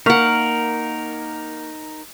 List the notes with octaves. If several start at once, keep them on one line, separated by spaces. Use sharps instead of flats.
A#3 D#4 A#4 F5 F#5 C#6 B6